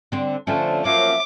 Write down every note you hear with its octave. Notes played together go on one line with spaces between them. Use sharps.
D3 C4
D3 F3 A3 C4 C#4 A5
F3 F#3 A#3 C#4 E5 D6